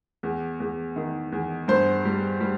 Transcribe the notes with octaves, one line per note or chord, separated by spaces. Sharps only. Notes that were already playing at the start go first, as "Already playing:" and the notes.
E2
E2
D#3
E2
G2 C5
G3
G3